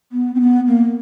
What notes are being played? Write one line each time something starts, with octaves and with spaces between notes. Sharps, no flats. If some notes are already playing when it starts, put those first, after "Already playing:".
B3
C4
B3
A#3